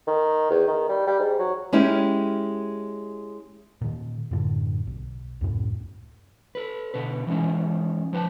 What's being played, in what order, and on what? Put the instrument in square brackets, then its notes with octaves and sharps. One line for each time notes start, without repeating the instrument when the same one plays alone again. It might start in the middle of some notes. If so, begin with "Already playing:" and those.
[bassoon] D#3
E2
D#3
G3
G3
G#2
F#3
[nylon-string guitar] G#3 C#4 E4 G4
[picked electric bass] A#2 D#3
F#2 A2 D3
B1
C#2 F#2 A2
[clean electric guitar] A4 B4
B2 D3 B4
E3 G#3 C#4 D#4
F3 B4 G#5 A5